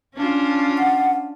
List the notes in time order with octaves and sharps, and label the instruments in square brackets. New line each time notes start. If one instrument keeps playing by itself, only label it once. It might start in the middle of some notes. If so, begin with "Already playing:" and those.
[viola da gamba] C#4 D4 F4
[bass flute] F#5